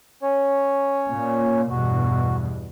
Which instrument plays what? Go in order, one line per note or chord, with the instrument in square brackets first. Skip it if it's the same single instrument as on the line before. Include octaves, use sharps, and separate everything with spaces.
[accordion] C#4 C#5
[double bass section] A#2
[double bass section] E2 G2 B2 [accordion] F#4